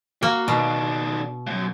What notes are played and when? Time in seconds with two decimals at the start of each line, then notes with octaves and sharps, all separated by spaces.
0.23 A#3 F#4
0.48 B2 D#3 D4
1.47 C#2 F#2